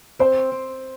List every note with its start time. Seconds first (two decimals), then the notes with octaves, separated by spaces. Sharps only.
0.19 C4 C5
0.52 C4